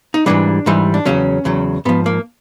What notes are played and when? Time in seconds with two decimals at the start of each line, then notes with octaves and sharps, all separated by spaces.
0.14 D#4
0.26 G#2 E3 G3 D4
0.66 G#2 E3 G3
0.94 D4
1.05 E2 C#3 F#3 C#4
1.45 E2 C#3 F#3
1.85 G#2 F3 B3
2.06 A#3